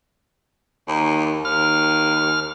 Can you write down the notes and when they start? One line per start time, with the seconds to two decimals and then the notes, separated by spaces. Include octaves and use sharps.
0.88 D#2
1.45 D#2 F6